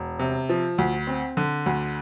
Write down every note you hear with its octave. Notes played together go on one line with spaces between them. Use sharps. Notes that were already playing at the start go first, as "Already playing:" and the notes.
Already playing: E1
C3
F3
D2
C4
D3
D2